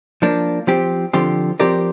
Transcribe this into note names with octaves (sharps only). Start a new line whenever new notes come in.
F3 A#3 D4
F3 C4 G4
D3 F3 C4 G4
F3 C4 G4 A#4 D5